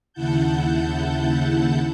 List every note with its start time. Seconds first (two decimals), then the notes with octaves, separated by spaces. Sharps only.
0.13 D#2 C#3 E4 F#5 A5 G6